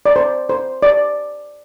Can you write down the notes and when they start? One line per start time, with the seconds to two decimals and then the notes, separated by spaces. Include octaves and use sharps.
0.06 D5
0.16 C5
0.49 C5
0.83 D5